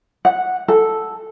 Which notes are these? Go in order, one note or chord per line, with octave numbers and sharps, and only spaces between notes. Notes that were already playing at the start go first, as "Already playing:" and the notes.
F#5
A4